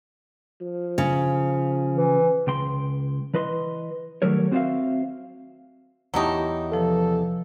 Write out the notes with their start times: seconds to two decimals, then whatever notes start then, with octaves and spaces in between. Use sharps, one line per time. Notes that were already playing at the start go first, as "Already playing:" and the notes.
0.61 F3
0.98 C#3
1.94 E3
2.47 C#2 G5 C6
3.34 E3 B4 D#5 C6
4.22 D#3 F#3 G3 A3 A#4 C#5
4.51 C4 F#4 C5 C#5 E5 F5
6.14 E2 F#3 A3 D#4 E4 G4
6.72 C3 F3 A4 B4